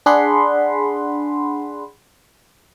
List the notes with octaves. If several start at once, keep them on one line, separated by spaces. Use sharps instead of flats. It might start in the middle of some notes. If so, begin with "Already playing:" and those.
D4 G#4 F#5 B5 C6